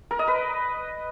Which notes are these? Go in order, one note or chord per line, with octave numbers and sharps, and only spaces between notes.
A#4
D#5
B4